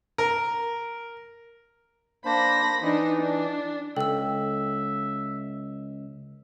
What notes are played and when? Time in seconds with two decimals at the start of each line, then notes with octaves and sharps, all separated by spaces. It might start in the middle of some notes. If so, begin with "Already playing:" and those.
0.18 A#4
2.25 A#3 D4 C5 B5 A#6
2.82 E3 D4 D#4
3.20 D4
3.97 C#2 A4 E5 G5 E6